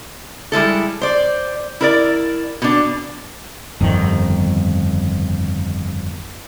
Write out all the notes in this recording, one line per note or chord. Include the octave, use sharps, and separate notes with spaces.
G3 G#3 E4 A4
C5 D5
E4 A#4 D5
B2 D4
G1 F2 A#2 D#3